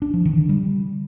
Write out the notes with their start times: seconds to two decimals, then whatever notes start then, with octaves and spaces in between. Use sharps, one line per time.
0.02 D4
0.14 F3
0.25 D#3
0.37 D3
0.49 G3